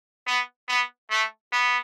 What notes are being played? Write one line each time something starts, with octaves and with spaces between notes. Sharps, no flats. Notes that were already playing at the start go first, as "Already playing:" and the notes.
B3
B3
A3
B3